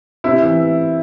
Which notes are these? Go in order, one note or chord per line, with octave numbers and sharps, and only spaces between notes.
C3 E4
E3